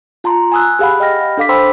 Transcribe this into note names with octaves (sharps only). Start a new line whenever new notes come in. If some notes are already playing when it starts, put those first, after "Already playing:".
F4 A5 A#5 C6
G#5 A5 D#6 E6 F#6
G4 G#4 F5 F#5 B5
D#5 G5 B5 F6 A#6
D4 A4 F5 D6 B6
C5 G5 A5 B5 C6 E6